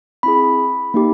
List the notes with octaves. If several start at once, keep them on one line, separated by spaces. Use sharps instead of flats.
C4 E4 G#4 B5
A#3 D#4 G4